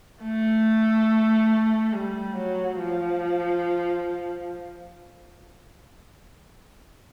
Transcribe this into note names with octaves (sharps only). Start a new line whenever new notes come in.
A3
G3
F#3
F3